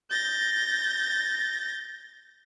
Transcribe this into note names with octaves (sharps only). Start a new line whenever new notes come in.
G6 A6 A#6